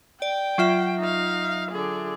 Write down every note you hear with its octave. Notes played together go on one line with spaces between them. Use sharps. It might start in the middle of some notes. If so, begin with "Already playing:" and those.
D5 G5
F#3 F4 E5
D#4 F5
D3 G#4